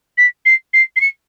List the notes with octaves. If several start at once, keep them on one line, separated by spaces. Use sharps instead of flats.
B6
C7
C7
C7
C#7